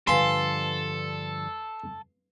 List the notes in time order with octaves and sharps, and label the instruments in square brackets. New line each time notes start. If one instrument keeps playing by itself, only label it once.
[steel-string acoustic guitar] G2 D3 F3 [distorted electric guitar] A4 [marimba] B4 F5 G#5 [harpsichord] C6